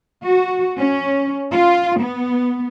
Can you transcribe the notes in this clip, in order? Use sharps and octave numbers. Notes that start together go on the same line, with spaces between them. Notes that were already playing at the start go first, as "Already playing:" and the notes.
F#4
C#4
F4
B3